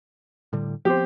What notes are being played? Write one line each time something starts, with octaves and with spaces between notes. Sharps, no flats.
A2 D3 G3
F3 B3 C4 G4 C5